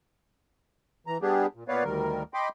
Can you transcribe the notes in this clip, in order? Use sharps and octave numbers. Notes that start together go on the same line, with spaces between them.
E3 A#5
G3 B3 D4 G4 G#4
A#2
A#2 B3 B4 C#5 D5 F5
D2 D#3 G3 A#4
D#5 G5 B5 C6 D6